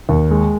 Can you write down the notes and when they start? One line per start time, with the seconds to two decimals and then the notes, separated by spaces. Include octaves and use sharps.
0.09 D#2
0.31 G#3